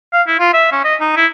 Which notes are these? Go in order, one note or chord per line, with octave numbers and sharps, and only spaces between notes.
F5
E4
F4
E5
C#4
D#5
D#4
E4